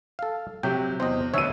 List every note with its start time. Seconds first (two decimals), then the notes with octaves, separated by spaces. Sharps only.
0.19 A4 F5
0.63 C3 F#3 G4 G5
1.00 E2 C5 D#5
1.34 D2 B2 C#5 E5 F#5 E6 D#7